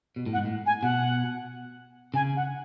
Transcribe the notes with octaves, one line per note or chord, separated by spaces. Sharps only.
B2
A2
F#5
G#2
A2
G#5
B2 F#5
C#3 G#5
F#5